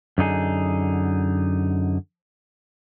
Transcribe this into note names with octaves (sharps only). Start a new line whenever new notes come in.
F#2 D3 D#4 G#4